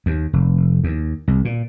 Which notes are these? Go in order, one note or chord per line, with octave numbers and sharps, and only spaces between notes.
D#2
F1
D#2
C2
A#2